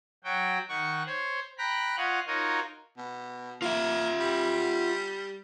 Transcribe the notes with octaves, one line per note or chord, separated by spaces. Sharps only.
F#3 F#4 G5
D#3 F#5 C#6
C5 C#5
G5 A#5 B5 F#6
F4 C#5 D#5 F5 F#5
D#4 F4 F#4 A#4 C#5 D#5
B2
A#3 F4 E5
G3